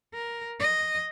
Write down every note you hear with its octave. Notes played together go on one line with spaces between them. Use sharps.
A#4
D#5